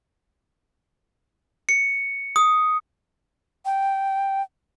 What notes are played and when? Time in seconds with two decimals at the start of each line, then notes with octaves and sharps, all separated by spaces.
1.69 C#7
2.36 D#6
3.65 G5